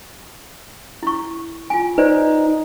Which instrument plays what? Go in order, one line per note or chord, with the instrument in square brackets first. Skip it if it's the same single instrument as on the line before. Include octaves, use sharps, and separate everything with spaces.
[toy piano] E4 C#6
F4 G#5
[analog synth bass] D#4 [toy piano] B4 C5 D5